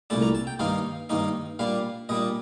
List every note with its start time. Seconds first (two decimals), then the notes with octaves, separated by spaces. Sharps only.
0.10 C2 A#2 A3 D4 A5
0.22 A#5
0.35 A5
0.47 G5
0.59 G2 D#3 A#3 D#4 F5
1.09 G2 D#3 A#3 D#4
1.59 A#2 G3 D4 F5
2.09 A#2 G3 D4 D#5